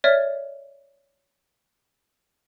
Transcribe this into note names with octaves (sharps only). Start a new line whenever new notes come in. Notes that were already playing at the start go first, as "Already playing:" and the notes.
C#5 D5 E5 F6 A6